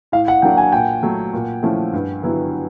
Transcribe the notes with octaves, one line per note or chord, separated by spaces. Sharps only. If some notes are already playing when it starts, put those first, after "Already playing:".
A2 F5
F#5
F#3 A#3 D4 G5
G#5
A#2 G5
F#3 A3
A#2
F3 A3 C#4 E4
G2
D3 F#3 B3 E4